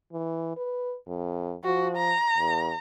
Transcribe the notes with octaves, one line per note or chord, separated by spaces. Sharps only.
E3
B4
F2
F3 F#4
A#5
E2